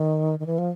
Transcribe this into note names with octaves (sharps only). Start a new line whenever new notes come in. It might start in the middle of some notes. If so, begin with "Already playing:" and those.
Already playing: D#3
D#3
E3
F3